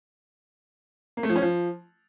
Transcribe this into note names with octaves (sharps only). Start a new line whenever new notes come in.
A#3
A3
F3
C#4
F3